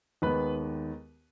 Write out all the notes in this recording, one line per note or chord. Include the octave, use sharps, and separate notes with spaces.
D#2 D#3 G#3 B3 B4